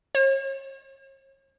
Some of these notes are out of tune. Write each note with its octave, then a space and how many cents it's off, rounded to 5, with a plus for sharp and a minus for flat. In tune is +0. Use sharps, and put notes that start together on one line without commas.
C#5 -45